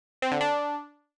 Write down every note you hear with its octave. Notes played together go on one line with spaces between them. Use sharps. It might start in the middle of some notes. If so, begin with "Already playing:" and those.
C4
D3
D4